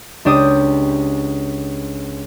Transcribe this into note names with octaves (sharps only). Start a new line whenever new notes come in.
C#2 D4 G4 D#6